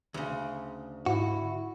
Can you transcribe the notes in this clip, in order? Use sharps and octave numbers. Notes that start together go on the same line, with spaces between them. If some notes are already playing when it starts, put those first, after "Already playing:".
D2 C#3
G#2 E4 F#4